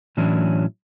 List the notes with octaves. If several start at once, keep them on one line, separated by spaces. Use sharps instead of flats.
A2 E3 F#3 C#4 D4 E4